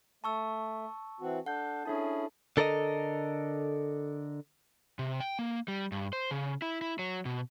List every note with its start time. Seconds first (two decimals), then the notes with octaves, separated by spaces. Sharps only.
0.24 A3 A5 C#6 E6
1.20 E3 C4 F#4
1.46 D4 A4 F#5 G6
1.85 C#4 D4 E4 G#4 A4 A5
2.57 D3 A4 A#4 D5 D#5
4.99 C3
5.20 G5
5.39 A#3
5.68 G3
5.92 G2
6.13 C5
6.31 C#3
6.62 E4
6.81 E4
6.99 F#3
7.25 B2